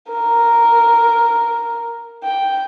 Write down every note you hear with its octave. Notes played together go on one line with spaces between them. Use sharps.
A#4
G5